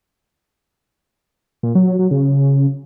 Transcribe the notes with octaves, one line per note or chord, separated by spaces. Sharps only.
A#2
F#3
F#3
F#3
C#3